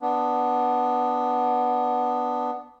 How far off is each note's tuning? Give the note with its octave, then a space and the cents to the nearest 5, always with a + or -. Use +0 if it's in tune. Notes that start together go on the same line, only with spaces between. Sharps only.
B3 +0 D4 +0